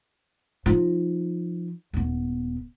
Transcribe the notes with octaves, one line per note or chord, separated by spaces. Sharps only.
F3 D#4
D#1 B3